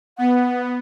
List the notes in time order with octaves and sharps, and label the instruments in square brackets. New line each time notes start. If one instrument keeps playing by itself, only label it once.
[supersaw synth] B3 [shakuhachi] F#5